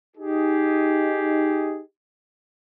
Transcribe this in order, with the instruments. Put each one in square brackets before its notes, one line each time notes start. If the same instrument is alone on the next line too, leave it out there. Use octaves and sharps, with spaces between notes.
[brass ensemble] D#4 G4 G#4